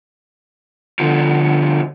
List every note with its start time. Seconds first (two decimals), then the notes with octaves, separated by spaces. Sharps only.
1.00 B2 D3 F3